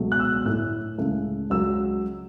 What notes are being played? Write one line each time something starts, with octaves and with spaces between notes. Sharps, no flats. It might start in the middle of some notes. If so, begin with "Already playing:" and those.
Already playing: C#2 B2 F#3 A3
F#6
E6
A2 A3 E4 F#6
C#2 C#3 A3 E4
C#2 C#3 F#3 E6